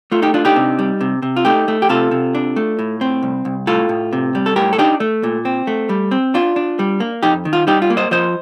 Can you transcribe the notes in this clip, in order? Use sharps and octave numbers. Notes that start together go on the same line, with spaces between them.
A3 F4
D#4 G4
D4 F4
D#4 G4
C3
G3
C3
C3
F4
A3 D#4 G4
A3
G4
C3 F4 A4
C3
D4
A3
A2
C4
C2
C2
A2 F4 A4
A2
C3
G3
A4
A2 G4 A#4
A4
D4 D#4 G4
A3
A#2
C4
A3
G3
C4
D4 F4
D4
G3
A#3
F2 D#4 G4
D#3
F4
G3 D#4 G4
F4
A#3
C5 D#5
F3 C5 D#5